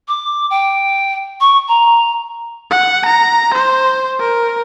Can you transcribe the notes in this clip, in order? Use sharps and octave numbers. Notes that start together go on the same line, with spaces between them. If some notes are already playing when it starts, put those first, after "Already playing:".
D6
G5
C#6
A#5
F#5
A#5
C5
A#4